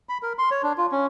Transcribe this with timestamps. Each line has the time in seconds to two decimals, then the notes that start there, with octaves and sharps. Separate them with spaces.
0.09 B5
0.23 A#4
0.39 C6
0.51 C#5
0.63 D4
0.78 F4
0.92 C#4